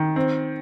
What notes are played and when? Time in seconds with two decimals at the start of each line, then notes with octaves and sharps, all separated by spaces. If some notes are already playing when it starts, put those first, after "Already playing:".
Already playing: D#3
0.16 C4